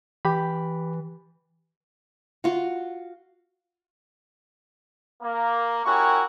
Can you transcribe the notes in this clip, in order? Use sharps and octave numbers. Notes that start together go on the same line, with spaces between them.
E3 G4 B5
F4 F#4
A#3
C#4 E4 F#4 G4 A#4 C#6